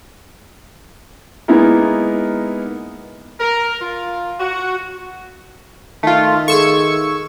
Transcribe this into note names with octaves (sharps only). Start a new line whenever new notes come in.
G#3 A#3 B3 D#4 E4 A#4
A#4
F4
F#4
D#3 A3 F4
G#4 A4 C#6 E6 G#6